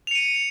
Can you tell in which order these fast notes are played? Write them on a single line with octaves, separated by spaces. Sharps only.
F7 C#7 D#7